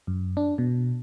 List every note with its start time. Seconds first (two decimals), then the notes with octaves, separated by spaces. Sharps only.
0.07 F#2
0.37 D4
0.58 B2